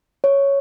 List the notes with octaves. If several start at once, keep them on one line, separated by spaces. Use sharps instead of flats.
C#5